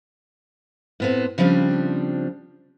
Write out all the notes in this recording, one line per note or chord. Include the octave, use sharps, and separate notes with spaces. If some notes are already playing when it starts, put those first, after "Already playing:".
A2 B3 C4
C#3 F3 G3 C4 D4